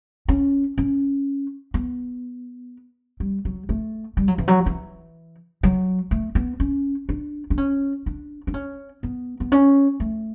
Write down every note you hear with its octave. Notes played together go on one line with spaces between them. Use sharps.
C#4
C#4
B3
G3
F#3
A3
G3
F#3
E3
F#3
E3
F#3
A3
B3
C#4
D4
D4
C#4
D4
D4
C#4
B3
B3
C#4
A3